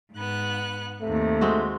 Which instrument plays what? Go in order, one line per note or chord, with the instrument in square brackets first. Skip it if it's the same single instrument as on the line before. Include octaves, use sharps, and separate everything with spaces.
[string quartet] G#2 B3 F#6
[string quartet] D#2 C3 [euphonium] A3
[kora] G#3 C4 F#4